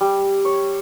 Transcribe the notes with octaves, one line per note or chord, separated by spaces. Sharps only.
G3
C#5